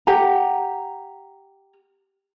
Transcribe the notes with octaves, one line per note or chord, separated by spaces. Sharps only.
G4 F#5 A#5